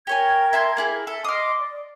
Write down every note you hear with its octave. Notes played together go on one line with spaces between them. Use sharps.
G4 A#4 C#5 G#5 G#6
E5 A5 C6
A#3 E4 G#4
A4 E5
D#5 C6 D6 D#6 F6
D5